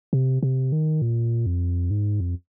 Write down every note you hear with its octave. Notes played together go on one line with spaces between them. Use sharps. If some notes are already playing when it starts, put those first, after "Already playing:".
C3
C3
D#3
A#2
F2
G#2
F2